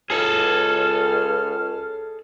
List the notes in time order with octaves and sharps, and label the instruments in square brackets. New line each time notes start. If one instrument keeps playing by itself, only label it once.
[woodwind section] C#2 F6 [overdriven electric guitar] G#4 A4